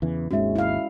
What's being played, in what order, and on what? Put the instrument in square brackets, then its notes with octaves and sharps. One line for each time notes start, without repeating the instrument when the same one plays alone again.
[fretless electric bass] E2 C#3 E3
[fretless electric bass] G#1 D#2 G#2 [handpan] G#3 C#4 [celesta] F#4 E5
[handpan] E4 F5